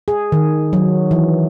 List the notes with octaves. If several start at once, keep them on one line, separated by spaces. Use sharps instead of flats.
G#4
D#3
F#3
E3